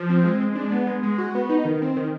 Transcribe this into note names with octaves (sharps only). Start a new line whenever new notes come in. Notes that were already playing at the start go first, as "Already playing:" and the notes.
Already playing: F3
C4
G#3
G#3
D4
B3
G#3
G#3
F#4
B3
D#4
D#3
C4
D#3